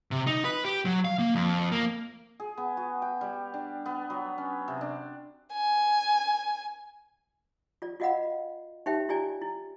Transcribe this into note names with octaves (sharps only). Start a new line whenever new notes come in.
C3
D#4
B4
G4
F#3
F5
A#3
F2
A#3
G#4
B3
F#4
G5
G3
D4
B3
F#3
C#4
C3
D4
G#5
F4 D5
F4 F#4 D#5 F5 F#5 B5
D#4 G4 C#5 E5 G5
E4 F4 G4 D5 G#5
E4